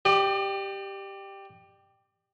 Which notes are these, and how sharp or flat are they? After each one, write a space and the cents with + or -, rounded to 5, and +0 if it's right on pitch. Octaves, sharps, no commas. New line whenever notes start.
G4 +0 D5 +40